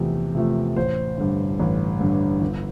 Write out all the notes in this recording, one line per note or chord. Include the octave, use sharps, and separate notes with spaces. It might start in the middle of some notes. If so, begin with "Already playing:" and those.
Already playing: E2 C3 F3 A3
C3 F3 A3
A1 C5
G2 D3
A1
G2 D3
G1